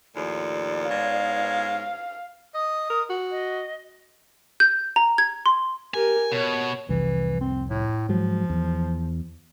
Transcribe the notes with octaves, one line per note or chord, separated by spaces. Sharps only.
D#2 A2 F3 D5
G#2 B3 C#5 F5
D#5 D#6
A#4
F#4
D#5
G6
A#5
G#6
C6
G4 A#4 G#5
B2 C#5
F1 C2 E3
C4
A2
G#2 F3 F#3
E2